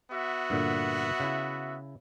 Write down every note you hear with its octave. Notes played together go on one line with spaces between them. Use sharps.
B3 F#4 E5
G2 A#2 D3
C#3 E4